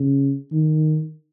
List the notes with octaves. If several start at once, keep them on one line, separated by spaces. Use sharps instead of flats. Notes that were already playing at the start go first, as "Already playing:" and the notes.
Already playing: C#3
D#3